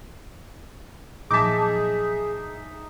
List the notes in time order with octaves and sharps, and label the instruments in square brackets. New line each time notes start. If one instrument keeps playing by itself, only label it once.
[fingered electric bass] A#1 F#3 [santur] D#4 E5 [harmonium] G#4 [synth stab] A5 D6